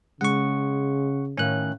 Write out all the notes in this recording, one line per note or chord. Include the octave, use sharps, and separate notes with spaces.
C#3 G#3 F#5 C#6
A2 D#3 C#4 F5 F#6